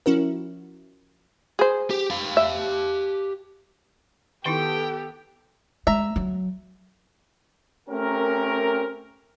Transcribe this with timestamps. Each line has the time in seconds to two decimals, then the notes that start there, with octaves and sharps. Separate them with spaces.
0.06 F3 C#4 E4 F#4 A#4
1.59 G#4 C5
1.90 G4
2.10 G4 F5
2.37 E5
4.46 D#3 B3 D#4 E4 G4 A4 G5
5.87 G#3 E5 A#5
6.16 F#3
7.88 A3 C4 C#4 G4 A#4